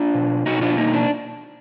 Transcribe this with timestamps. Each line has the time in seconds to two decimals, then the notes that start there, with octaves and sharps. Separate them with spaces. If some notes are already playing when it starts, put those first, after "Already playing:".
Already playing: D4 F4
0.15 B2
0.46 B2 D#4 F#4
0.61 D4 F4
0.77 A#3 D#4
0.94 D4